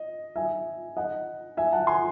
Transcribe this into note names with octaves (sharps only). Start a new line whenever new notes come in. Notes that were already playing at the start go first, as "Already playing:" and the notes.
Already playing: D#5
E5 G#5
D#5 F#5
E5 G#5
F#5 A5
G#5 C6